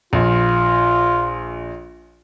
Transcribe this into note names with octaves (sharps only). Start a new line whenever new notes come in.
A#1 F4